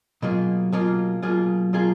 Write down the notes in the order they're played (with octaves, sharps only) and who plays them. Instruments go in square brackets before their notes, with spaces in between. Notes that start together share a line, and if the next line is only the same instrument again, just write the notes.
[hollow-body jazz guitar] B2 A#3 F4 G#4 [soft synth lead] F#3
[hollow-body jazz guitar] B2 A#3 F4 G#4
[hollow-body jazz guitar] B2 A#3 F4 G#4 [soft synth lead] F#3
[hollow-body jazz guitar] B2 A#3 F4 G#4